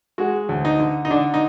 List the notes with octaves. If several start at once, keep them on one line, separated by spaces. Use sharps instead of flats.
G#3 F#4
D2
D#4
D3
D#4
D3 D4
D#4